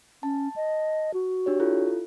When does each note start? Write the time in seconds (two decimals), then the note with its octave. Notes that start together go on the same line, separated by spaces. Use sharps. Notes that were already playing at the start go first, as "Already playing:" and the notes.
0.23 C#4 A5
0.56 D#5
1.14 F#4
1.46 D4 G4 C#5
1.60 E4 F4 A4